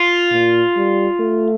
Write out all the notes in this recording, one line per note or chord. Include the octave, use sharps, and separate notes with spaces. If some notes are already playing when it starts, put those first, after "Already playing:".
Already playing: F4
A#2
G3
A3